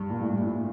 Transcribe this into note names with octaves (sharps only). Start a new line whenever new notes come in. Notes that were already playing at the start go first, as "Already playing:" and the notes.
Already playing: G2
A#2
A2
G2
A2